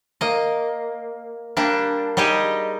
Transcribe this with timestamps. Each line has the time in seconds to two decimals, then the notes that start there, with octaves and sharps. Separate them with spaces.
0.21 A#3 D#5
1.57 G3 A#3 D4
2.17 G3 D#4 G4 G#4 D#5